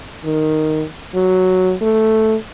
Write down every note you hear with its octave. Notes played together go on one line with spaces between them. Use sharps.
D#3
F#3
A3